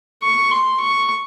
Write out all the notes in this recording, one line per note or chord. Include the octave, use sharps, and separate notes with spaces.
C#6
C6
C#6